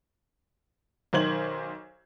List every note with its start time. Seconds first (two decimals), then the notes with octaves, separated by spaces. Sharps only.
1.13 B1 D#3 C5 G#6 F#7